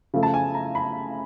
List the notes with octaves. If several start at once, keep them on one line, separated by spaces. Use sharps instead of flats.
C#3 F3 A3
A5
G#5
A#5
B5